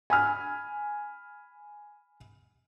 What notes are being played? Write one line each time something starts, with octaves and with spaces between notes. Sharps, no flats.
G#5 B5 F6